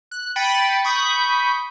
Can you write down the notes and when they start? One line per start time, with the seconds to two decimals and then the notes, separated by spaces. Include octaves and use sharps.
0.11 F#6
0.36 G5 B5 A6 B6 C#7 D#7
0.84 B5 C#6 D#6 G6 B6